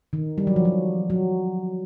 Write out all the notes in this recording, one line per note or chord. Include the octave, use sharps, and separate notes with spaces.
D#3
G3
F#3
F3
F#3
F#3